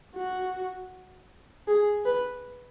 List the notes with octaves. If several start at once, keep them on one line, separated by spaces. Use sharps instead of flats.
F#4
G#4
B4